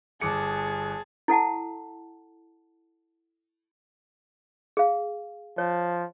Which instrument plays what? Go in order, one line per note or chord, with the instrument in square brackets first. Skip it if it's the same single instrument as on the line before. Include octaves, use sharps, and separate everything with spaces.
[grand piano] G1 D6 C#7 [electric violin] G#4 A5
[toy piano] E4 A4 F#5 A5
G#4 F5
[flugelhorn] F3 [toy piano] C#5